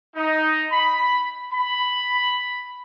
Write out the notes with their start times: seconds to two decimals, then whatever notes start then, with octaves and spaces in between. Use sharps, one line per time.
0.15 D#4
0.71 B5
1.52 B5